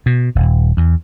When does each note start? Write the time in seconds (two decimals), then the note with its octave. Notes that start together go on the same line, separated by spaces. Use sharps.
0.06 B2
0.35 D#1
0.77 E2